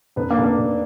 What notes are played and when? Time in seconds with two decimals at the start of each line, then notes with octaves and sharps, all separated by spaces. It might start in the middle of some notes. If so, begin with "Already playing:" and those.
0.16 F1 B3
0.31 A#3 D4
0.38 F1
0.44 A#3 D4
0.58 F1